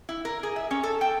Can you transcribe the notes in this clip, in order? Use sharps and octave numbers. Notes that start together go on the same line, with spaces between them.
E4
A#4
G#4
E5
C#4
A4
G5